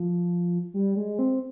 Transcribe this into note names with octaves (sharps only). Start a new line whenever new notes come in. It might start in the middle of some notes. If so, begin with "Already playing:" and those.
Already playing: F3
G3
G#3
C4